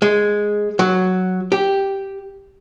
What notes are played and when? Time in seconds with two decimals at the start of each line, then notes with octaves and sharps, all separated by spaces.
0.02 G#3
0.79 F#3
1.52 G4